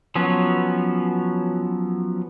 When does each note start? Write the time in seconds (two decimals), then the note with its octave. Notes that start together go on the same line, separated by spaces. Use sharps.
0.15 F3 F#3 B3 C#4